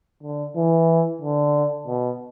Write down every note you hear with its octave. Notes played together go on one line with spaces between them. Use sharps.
D3
E3
D3
B2